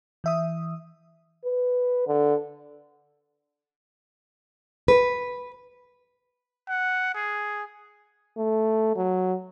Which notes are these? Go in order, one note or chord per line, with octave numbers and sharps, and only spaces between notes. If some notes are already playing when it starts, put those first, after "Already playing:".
E3 E5 D#6
B4
D3
B4
F#5
G#4
A3
F#3